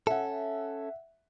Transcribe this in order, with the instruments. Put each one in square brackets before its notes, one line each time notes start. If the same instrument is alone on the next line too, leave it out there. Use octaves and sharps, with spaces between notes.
[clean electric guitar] C#4 A4 [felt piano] E5 F#5